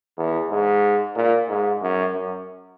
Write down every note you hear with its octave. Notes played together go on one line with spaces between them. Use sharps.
E2
G#2
A#2
G#2
F#2
F#2